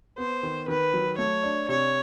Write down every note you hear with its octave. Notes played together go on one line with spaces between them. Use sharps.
B3 C5
D#3
D#3 B4
F#3
A3 C#5
D4
C3 C#5